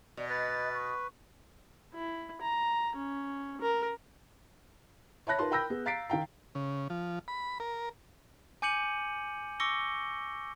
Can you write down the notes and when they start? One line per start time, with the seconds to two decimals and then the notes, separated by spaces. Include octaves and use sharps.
0.17 B2 D5
0.29 B4 D#5 A6
0.74 C#6
1.93 E4
2.41 A#5
2.96 C#4
3.61 A#4
5.27 C#5 E5 A5 B5 F#6 A#6
5.39 D#4 F4 A#4 B4 A5 C6
5.51 A#4 G5 B5 E6 G6 A#6
5.70 B3 G#4
5.85 F5 A#5 A6 B6 C7 D7
6.10 D#3 F5 G5 A#5
6.55 C#3
6.90 F3
7.28 B5
7.60 A#4
8.62 G#5 D6 G6 C#7 D#7 F#7
9.60 C#6 D6 E6 A#6 C#7 G7